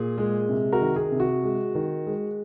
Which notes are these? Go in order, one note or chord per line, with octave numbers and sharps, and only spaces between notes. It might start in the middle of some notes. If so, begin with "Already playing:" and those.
Already playing: A#2 G#4
G#3
C3
F#4 A#4
D#3
G#4
C3
F#4
G#3
D#3
G#3